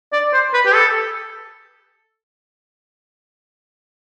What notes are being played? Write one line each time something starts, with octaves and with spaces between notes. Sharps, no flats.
D5
C5
B4
G4
A4